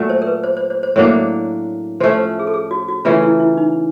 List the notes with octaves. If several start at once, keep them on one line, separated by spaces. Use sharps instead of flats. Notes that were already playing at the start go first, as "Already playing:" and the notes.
Already playing: A#2 F#3 A3
C5
A#4
B4
C5
C5
C5
C5
A2 F#3 A#3 D4 C#5
F3 A3 C#4 C5
C5
G#4
A4
G#4
F#4
F#4
C#3 E3 A3 C#4 F4
E4
E4
D#4